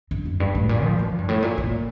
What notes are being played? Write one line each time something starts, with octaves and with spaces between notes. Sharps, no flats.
G2
F2
G2
A2
A#2
F3
F3
A#2
G2
A2
A#2
A#2